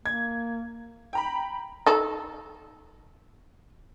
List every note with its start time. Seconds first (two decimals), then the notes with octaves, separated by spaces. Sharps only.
0.06 A#3 G#6
1.13 G5 A#5 B5
1.86 D#4 A4